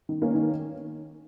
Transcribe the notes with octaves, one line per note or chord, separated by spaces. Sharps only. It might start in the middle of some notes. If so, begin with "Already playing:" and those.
D#3
A#3 C#4
D#3